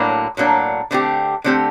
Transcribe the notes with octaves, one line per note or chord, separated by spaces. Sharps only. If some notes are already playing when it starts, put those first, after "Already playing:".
Already playing: A2 F#3 A#3 D4
A2 F#3 A#3 D4
D3 A3 C4 G4
D3 A3 C4 G4